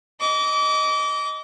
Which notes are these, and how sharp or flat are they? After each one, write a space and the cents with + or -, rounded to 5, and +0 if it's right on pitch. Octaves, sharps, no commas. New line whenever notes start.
D#5 +0 D6 -30